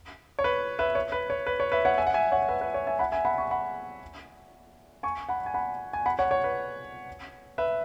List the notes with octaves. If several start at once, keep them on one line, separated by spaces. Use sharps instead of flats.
C#5
B4
B4 E5
C#5
B4
C#5
B4
C#5
B4 E5
C#5 F#5
E5 G#5
F#5
E5 G#5
C#5 F#5
F#5
B4 E5
B4
C#5
E5 G#5
F#5 B5
E5 G#5
F#5 B5
G#5 C#6
F#5 B5
G#5 C#6
F#5 B5
G#5
F#5 B5
G#5
F#5 B5
C#5 F#5
C#5
B4
B4 E5